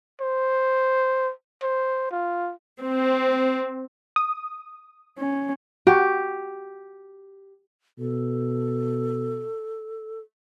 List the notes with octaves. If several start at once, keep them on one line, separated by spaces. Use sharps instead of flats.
C5
C5
F4
C4
D#6
C#4
F#4 G4
B2 A4